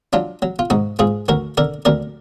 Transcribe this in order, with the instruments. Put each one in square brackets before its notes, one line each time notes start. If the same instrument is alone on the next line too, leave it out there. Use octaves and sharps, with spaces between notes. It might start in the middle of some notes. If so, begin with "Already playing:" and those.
[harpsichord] F#3 D4 F4
F#3
F4
G#2 D#4 F#4
G#2 F4 G#4
D2 F#4 A#4
D3 A#4 D5
D2 A#4 D5